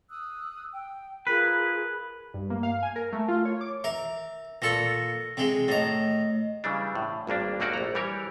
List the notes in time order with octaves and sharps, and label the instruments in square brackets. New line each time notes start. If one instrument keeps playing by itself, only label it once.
[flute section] D#6 E6 F#6
G5
[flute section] F4 G#4 A#4 [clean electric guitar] B4
[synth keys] G2
A#3
F5
G#5
A#4
A3
F4
C#5
D6
[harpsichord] A#4 [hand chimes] E5
[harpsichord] A#2 A4 C#6 [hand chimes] A#6
[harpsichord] C3 G#3
[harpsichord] A2 A#5 [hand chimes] D#5 A#6
[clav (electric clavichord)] C#3 E3 G3 D4
A2
G#1 G2 A#3 D4
D#2 A3 A#3 F#4 D5
A#1 A#5
E3 G3 G4 A#4 C#5